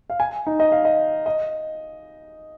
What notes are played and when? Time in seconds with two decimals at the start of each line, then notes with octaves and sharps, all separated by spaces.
0.10 F5
0.20 G#5
0.46 D#4
0.60 D#5
0.72 F5
0.85 D#5
1.26 D#5